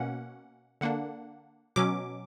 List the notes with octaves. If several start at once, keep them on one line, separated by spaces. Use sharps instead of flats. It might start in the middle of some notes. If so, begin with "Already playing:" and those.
Already playing: B2 A#3 C#4 F#5
D3 A#3 D4 F#5
B2 F#3 C#4 D6